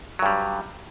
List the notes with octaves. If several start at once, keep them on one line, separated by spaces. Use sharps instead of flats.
G2 F#3 G3